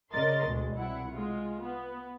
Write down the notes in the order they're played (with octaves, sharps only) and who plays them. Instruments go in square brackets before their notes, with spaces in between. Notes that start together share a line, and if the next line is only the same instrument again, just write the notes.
[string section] C#3 A#4 D5 D#5 C6 A6
D2 B2 G#3
C2 E4 F#5
G#3 F4
B3